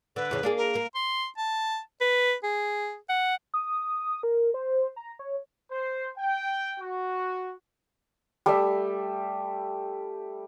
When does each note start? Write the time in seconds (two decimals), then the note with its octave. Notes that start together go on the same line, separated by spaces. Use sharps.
0.16 D3 B4
0.31 E2 C#3 G#3
0.43 A#3 D4 G#4
0.57 A#4
0.75 A#3
0.95 C6
1.38 A5
2.01 B4
2.44 G#4
3.09 F#5
3.54 D#6
4.23 A#4
4.54 C5
4.96 A#5
5.19 C#5
5.70 C5
6.17 G5
6.79 F#4
8.46 G3 A3 E5